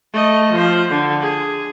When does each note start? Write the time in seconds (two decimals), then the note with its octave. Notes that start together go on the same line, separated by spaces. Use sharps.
0.13 A3 D#5
0.53 F3 C5
0.90 D3
1.21 G#4